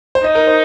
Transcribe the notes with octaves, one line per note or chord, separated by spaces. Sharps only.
C5
D#4 D#5
A#4
C5